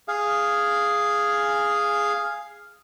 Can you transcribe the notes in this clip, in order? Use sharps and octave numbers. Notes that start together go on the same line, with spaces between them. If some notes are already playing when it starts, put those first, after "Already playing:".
G#4 F5